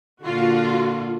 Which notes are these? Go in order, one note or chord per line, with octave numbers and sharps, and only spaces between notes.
A#2 D3 F4 F#4